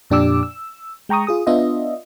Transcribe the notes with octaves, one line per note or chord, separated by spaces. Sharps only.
F2 A#2 D4 G4 D6 E6
E6
G#3 G5 A#5 C#6 D#6
F4 G#4 D#6
B3 D4 F4 D#5 E5